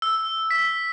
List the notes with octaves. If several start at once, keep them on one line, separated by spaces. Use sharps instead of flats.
E6
B6